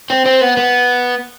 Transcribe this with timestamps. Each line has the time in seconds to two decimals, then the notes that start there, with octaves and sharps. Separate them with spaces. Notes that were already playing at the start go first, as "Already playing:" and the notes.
0.10 C4
0.26 C4
0.41 B3
0.57 B3